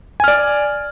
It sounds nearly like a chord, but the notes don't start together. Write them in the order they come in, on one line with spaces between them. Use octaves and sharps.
G#5 F6 D5